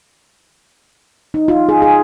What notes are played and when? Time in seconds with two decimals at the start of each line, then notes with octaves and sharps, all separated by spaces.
1.34 D#4
1.48 F4
1.69 G#4
1.82 G#4